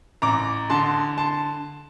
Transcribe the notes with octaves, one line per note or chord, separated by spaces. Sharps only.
A1 A#5 D6
D3 A5 C6
A5 C6